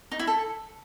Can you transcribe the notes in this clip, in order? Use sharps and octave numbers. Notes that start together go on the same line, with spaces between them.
D#4
E4
A4